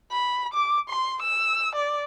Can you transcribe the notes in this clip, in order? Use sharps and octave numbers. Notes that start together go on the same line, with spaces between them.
B5
D6
C6
E6
D5